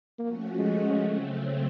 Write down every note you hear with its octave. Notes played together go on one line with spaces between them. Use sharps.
F3 A3 A#3 C#4 F#4
G#3
C#3 F#3 A3 C4